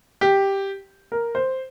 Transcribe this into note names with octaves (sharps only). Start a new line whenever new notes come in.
G4
A#4
C5